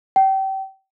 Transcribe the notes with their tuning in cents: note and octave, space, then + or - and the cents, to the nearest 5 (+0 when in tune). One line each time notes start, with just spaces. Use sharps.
G5 -30